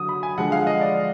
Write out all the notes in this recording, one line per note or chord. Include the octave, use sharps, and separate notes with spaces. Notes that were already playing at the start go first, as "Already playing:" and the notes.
Already playing: D3 F#3 D#6
B5
G#5
D3 F3 G#3 F#5
F5
D#5
D5